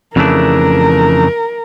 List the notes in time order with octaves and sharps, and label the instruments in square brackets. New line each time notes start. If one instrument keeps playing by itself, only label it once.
[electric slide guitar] F2 C#3 E3 A3 D4 [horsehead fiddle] A#4